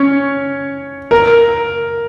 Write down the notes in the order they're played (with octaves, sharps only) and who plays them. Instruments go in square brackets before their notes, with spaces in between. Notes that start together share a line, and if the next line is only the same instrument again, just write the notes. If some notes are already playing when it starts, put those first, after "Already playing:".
Already playing: [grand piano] C#4 C#5
A#4